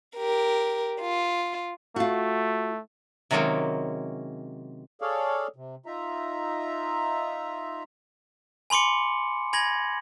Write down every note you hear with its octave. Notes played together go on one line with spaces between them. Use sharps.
G4 A#4
F4
A3 F4 F#4
C3 D#3 F#3 G#3 A#3 C#4
G#4 A4 C#5 D5 F5
C3
D#4 F4 E5 A#5
G#5 B5 C6 D6 C#7
G#5 B5 G#6 A#6 F#7